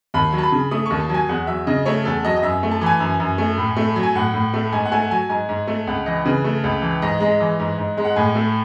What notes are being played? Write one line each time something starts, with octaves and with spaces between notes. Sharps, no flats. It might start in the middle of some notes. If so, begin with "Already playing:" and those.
D#2 B5
F#3
A5
B5
C#3
A3 D#6
D#2 C#6
A5
F#3
G#5
E2 F#5
F#3 E5
C#3 D#5
A3 C#5
E2 A4
F#3 D#5
D#5
F#2 E5
A3
A5
E3 G#5
F#2
F#2
A3
A2
A3
F#3
G#5
A2 F#5
A2
A3
G#2 G#5
F#5
A3 G#5
F#5
F#3 G#5
G#2 G#5
G#2
A3
C#2 F#5
E3 D#5
C#3 B4
A3
C#2
E3
G#2 D#5
G#3
E3
G#2
G#2
G#3
F#5
A2 G#5
A3